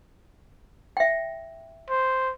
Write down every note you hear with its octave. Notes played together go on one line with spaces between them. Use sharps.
E5 G5
C5